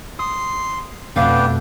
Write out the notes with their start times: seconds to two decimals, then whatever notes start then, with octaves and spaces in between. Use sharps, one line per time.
0.19 C6 D#6
1.16 F2 B2 A3 B3 D4 F5 G5